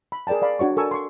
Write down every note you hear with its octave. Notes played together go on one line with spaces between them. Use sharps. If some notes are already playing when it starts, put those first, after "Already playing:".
B5
G#4 A#4 D5 G5 A5
D5 F5 B5
D4 F#4 C#5 C#6
A4 A#4 G#5 C#6 E6
C6 C#6